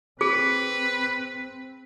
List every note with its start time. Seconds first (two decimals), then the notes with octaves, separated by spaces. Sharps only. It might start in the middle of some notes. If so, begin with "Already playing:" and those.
0.21 C4 G#4 B4